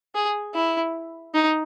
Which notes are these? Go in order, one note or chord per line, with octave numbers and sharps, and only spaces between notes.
G#4
E4
D#4